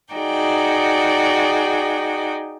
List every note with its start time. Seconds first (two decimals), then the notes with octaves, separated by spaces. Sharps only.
0.15 D#4 F#4 G#4 D5 G5